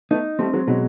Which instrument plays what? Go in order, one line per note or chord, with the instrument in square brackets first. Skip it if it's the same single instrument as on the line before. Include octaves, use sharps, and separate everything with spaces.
[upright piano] A3 B3 [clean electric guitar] D#4
[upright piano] G3 A3 [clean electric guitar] C4
[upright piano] F#3 G#3
[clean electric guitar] B2 [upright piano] F#3 G#3